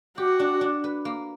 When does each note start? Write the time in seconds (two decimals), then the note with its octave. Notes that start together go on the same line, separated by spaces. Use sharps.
0.18 F#4 G4
0.40 D4
0.61 D4
0.84 B4
1.05 A#3